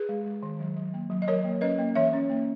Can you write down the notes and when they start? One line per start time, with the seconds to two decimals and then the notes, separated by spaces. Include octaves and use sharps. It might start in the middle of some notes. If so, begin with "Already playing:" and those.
Already playing: G#4 B4
0.09 G#3
0.26 G#3
0.43 D#3
0.60 F#3
0.76 F#3
0.94 A#3
1.10 F#3
1.22 D#5
1.28 F#3 A#4 C#5
1.44 A#3
1.61 C#4 B4 D#5
1.79 A#3
1.95 E3 C#5 E5
2.13 C#4
2.30 A#3